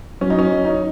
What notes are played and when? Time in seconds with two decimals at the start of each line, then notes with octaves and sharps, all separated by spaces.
0.21 F#3 C#4
0.30 D#4
0.39 C#4
0.65 D#4